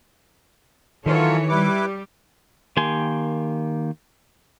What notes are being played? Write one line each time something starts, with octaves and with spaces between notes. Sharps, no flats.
D#3 E3 F#3 F4 A4 C#5
G3 E4 G4 B4 D6
D#3 A#3 G4 G#5 C6